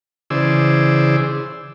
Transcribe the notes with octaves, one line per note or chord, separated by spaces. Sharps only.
C#3 E3 G#4 C5 D5 E6